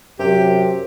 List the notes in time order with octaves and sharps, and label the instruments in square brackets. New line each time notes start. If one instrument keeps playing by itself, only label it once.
[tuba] F#2 [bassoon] C3 [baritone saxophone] G4